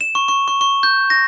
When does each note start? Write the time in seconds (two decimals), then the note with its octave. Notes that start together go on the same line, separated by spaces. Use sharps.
0.01 E7
0.15 C#6
0.28 C#6
0.48 C#6
0.61 C#6
0.83 G6
1.10 A#6